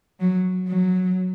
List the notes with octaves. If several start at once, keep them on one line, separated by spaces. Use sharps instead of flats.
F#3
F#3